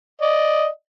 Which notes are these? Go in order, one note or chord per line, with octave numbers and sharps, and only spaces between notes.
D5 D#5